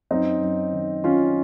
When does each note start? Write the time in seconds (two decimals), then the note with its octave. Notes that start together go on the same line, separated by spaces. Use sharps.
0.11 F#2 C4 D#4
0.41 F#2
0.73 D#3
1.04 D#3 C#4 F4